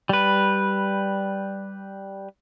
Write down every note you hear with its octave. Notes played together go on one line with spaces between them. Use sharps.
G3 B4